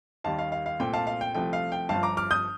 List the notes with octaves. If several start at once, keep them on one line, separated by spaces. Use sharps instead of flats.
D#2 D#3 G3 F5 A5
F5
F5
F5
C2 A#2 A3 C4 G5
F5 A5
F5
G5
C2 C3 F3 A3 G5
F5
G5
G1 G2 F3 F5 A5
A#5 D6
D6 F6
D#6 G6